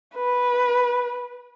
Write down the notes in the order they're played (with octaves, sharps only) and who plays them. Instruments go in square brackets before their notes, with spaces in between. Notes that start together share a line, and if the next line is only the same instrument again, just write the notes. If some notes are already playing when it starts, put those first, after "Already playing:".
[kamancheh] B4